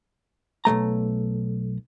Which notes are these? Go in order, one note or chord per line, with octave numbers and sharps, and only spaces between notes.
B1 F2 A3 A#5